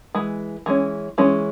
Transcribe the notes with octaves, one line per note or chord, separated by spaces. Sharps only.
E3 G#3
E3 G#3 C#4
E3 G#3 C#4